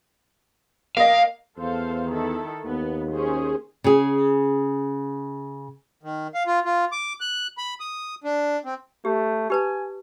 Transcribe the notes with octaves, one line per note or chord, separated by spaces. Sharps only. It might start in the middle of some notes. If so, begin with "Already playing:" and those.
A#3 D#5 F5
E2 A4 C5 F5
D#3 E4 A4
D#2 B3
C#4 G#4 C5
C#3 G#4
D#3
F5
F4
F4
D6
F#6
B5
D#6
D4
C4
A3 G4
G4 B4 G#5 A5